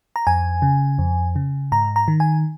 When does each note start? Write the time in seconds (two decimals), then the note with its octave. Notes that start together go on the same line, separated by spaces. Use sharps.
0.16 A#5
0.27 F2 G#5
0.62 C#3
0.99 F2
1.36 C#3
1.72 G#2 A#5
1.96 A#5
2.08 D#3
2.20 G#5